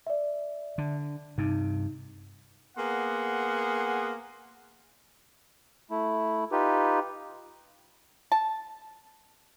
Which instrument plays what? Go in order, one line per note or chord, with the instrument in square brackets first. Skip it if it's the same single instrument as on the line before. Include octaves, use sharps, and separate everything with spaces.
[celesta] D5 E5
[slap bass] D3
[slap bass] G2 C3 [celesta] D#4
[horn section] A#3 B3 G#4 F#5 C6
[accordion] A3 E4
D#4 F4 G4 B4
[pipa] A5